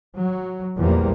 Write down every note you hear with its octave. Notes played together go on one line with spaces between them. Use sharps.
F#3
A#1 E2 F3 G3 A#3